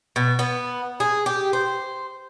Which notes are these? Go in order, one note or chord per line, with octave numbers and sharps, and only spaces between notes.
B2
B3
G#4
G4
C5